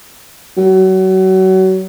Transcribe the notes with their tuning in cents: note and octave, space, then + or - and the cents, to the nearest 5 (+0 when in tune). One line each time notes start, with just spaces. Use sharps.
F#3 +30